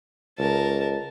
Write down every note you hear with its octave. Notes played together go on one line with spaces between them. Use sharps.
C#2 A#4 A5